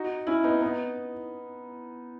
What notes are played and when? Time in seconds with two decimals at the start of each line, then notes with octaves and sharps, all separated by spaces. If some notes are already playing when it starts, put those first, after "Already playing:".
Already playing: D#4 F#4
0.27 C#4 E4
0.44 B3 D#4
0.62 B3 D#4